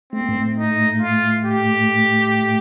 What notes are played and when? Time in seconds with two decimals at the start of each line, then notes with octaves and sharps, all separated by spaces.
0.13 A3 C4
0.21 A#3
0.29 A2 A3
0.57 D#4
1.01 F4
1.45 G4